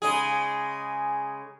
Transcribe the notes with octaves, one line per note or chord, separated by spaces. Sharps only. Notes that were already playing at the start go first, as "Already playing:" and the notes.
C#3 G#3 G#4